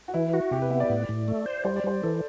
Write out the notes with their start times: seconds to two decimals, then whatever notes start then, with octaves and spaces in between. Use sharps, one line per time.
0.08 F#4
0.14 E3 E4
0.34 F#4
0.51 C3 G4
0.62 B4
0.70 B3 E5
0.80 D5
0.89 A2
1.09 A2
1.28 A3
1.46 C5
1.65 G3 C5
1.76 D5
1.84 G3 C5
2.03 E3 A4